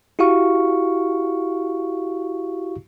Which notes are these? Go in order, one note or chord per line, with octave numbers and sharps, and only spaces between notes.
E4 F#4 G4 F5 C#6